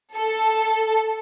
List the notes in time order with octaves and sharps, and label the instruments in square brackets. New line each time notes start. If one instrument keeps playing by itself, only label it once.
[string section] A4